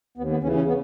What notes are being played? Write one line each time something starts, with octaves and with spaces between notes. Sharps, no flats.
D#2 B3
B3
C#3 E3 C#4
C#4
B3